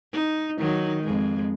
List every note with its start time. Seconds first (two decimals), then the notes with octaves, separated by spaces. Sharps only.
0.13 D#4
0.59 D#3 F#3 D#4
1.03 F2 G#3